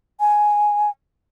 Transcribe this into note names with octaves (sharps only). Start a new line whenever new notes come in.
G#5